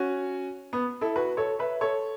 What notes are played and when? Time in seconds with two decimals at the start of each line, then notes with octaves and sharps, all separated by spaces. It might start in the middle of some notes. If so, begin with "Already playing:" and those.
Already playing: C#4 F#4
0.73 B3
1.01 E4 A4
1.16 F#4 B4
1.37 A4 C#5
1.59 B4 E5
1.81 A4 C#5